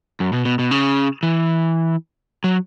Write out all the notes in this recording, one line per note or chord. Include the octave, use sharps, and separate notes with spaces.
F#2
B2
B2
B2
C#3
E3
F#3